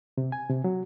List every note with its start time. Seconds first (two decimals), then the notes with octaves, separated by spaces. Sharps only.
0.18 C3
0.32 G#5
0.50 C3
0.64 F#3